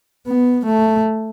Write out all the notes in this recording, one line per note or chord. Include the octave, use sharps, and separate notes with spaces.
B3
A3